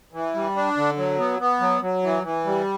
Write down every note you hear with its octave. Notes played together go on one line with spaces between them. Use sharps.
E3
G3
D4
D3
F#3
B3
B3
F#3
F#3
E3
E3
G3